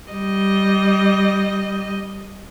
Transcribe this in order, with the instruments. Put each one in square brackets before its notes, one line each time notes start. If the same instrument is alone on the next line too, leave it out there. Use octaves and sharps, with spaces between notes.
[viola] G3 D#5